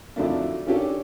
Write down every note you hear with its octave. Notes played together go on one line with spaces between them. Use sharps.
F2 D3 D#3 F#3 A3 D4
D#3 C#4 D4 G4 A4